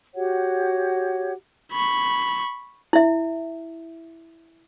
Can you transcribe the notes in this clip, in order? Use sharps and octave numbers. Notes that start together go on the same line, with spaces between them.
F#4 G4 C#5 F#5
B5 C#6
E4 E5